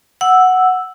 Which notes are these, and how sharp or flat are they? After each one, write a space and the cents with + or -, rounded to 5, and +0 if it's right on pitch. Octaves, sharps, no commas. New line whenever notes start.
F#5 +0 E6 +0